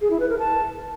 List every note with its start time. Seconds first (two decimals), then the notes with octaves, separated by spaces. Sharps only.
0.01 G#4
0.10 E4
0.20 B4
0.29 A#4
0.39 A5